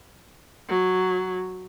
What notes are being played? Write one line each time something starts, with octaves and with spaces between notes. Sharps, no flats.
F#3